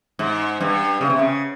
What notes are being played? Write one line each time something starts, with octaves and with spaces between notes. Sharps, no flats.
G#2
G2
C#3
C3
C#3